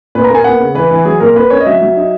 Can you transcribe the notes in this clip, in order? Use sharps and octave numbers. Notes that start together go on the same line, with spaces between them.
A#2 B4
A#5
A#3 G#5
B3 F#5
C#3
E3 B4
E3
F#3 G#4
A#2 A#4
A#3 B4
C#4 C#5
D#5
F#3 E5
F#3
D#4